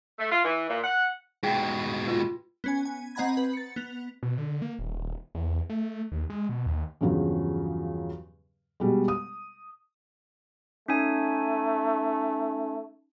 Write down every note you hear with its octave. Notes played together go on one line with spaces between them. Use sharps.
A3
F4
E3
A#2
F#5
G#2 B2 G#4 G5
F4 F#4 B4
B3 C#4 G#5
G#5
C4 D#5 F#5 A#5 B5 G#6
B4
A6 C#7
B3 F#6 F7
B2
D3
A#3
D#1
E2
A3
D#2
G#3
B2
D#2
E2 G2 C#3 F3 F#3
B2 G3 G#3
D#6
A3 C#4 D#4 G#5